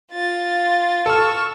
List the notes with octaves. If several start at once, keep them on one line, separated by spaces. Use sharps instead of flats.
F4 A6
A4 C#6 E6 F6